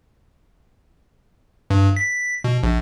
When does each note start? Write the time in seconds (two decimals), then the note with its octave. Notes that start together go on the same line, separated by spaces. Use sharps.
1.70 G2
1.96 B6
2.44 B2
2.63 A#1